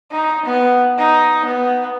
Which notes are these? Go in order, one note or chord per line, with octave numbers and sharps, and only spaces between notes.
D#4
B3
D#4
B3